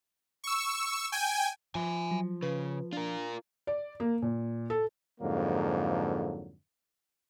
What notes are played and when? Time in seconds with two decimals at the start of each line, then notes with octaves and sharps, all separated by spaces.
0.44 C#6 E6
1.12 G5 G#5
1.75 F3 E5 G#5
2.11 F#3
2.43 C#3 B4
2.93 D4 F4 A#4
3.67 D5
4.00 A#3
4.22 A#2
4.70 A4
5.20 F2 G#2 D3 F#3 A#3